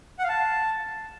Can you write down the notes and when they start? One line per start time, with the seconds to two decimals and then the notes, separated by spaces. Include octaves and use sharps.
0.19 F#5
0.24 F5
0.29 A5